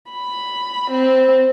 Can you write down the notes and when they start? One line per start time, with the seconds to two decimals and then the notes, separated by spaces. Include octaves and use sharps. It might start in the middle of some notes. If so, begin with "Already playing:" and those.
0.11 B5
0.91 C4